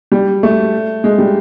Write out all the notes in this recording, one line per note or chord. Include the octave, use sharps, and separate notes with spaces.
G3
A3
G#3
G3